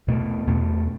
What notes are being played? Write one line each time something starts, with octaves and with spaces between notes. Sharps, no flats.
E2 B2 A3
E2 B2 A3